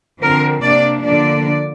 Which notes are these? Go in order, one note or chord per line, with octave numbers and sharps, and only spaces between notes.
D3 F3 C4 A#4
C3 A#3 D4 D5
D3 F3 A#3 D4 D5